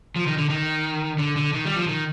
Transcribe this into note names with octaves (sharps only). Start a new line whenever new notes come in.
F3
D#3
D3
D#3
D3
D3
D#3
G3
F3
D#3